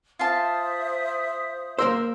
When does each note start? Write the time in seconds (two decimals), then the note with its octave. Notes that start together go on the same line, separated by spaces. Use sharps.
0.19 F4 C5 E5 F5 A5 D#6
1.79 A#3 A#4 C5 E6